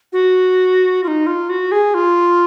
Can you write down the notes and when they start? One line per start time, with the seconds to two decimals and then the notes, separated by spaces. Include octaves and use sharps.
0.13 F#4
1.04 F4
1.08 D#4
1.27 F4
1.49 F#4
1.72 G#4
1.94 F4